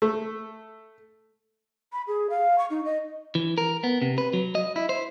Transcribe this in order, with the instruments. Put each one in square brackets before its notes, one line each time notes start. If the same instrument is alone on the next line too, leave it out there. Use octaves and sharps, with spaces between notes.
[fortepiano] A3
[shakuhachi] B5
G#4
F5
C#6
D#4
D#5
[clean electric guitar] E3
A#4
B3
C3
B4
F#3
D#5
E4
C5